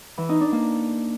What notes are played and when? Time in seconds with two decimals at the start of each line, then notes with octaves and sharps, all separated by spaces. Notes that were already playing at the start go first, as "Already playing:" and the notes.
0.18 E3
0.29 D#4
0.40 D4
0.52 A#3